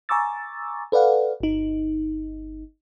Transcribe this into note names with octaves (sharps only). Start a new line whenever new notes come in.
G#5 A#5 C#6 D6 E6 A6
A4 B4 D5 F5 F#5
G1 D#4